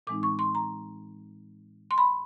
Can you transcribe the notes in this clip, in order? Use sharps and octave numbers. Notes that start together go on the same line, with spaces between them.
A2 E3 G#3 C4 D#4 D6
C#6
C6
A#5
C6
B5